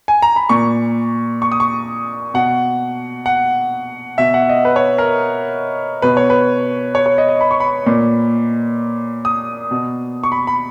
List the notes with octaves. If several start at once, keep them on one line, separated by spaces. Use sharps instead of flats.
G#5
A#5
B5
A#2 C#6
C#6
D#6
C#6
B2 F#5
F#5
B2 E5
F#5
D#5
B4
C#5
A#4
B2 B4
C#5
B4
C#5
C#5
D#5
D#5
B5
C#6
B5
A#2
D#6
B2
C#6
B5
B5